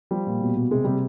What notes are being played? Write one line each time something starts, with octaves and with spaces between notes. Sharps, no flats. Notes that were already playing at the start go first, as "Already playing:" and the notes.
F3 G3
A#2
B2
B2
C3 G#3
C3 G3